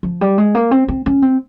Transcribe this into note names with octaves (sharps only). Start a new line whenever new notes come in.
F3
G3
G#3
A#3
C4
C4
C#4
C4